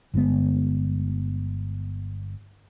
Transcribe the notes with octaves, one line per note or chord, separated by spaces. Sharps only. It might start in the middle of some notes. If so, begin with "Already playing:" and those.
G1 D3 G#3 B3